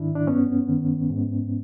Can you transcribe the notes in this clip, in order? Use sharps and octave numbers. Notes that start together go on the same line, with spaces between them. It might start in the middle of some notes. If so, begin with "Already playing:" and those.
Already playing: G#2 D#3 D4 E4
D4
G2 B3 C#4
D#3
G#2